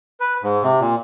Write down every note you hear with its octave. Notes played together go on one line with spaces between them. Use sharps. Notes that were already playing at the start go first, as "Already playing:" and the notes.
B4
G#2
C3
A#2